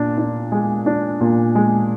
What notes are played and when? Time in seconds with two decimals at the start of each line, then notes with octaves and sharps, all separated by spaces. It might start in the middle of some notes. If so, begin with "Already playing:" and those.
Already playing: A#2 D4
0.18 D4
0.52 G#3
0.86 D4
1.20 A#2
1.55 G#3